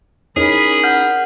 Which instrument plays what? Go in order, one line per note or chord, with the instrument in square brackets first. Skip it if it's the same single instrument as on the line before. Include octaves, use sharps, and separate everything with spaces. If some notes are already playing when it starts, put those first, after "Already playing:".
[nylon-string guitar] C#4 D#4 [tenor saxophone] G#4 [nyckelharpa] A#4 B5
[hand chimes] F#5 F6 G6